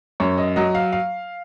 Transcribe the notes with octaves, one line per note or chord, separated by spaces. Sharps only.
F#2 C#5
D#5
F#3 D#5
F5
F5